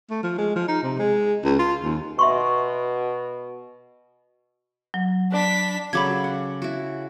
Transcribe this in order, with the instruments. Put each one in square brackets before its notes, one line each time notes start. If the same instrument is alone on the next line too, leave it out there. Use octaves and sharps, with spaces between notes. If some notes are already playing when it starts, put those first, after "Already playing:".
[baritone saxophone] A3
F3
G#3
F3
D#4
C3
G#3
C#2
F4
D#2
[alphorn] B2 [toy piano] E5 C6 C#6
[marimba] F#3
[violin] D4 B6 [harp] B4 D5 A5
[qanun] C#3 F#3 A4 [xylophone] B5 D6 G#6
[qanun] F#5
E4 F#4